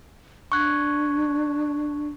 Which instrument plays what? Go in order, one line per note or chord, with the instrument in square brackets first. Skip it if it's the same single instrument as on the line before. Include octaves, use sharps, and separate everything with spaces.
[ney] D4 [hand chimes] C#6 F#6 G#6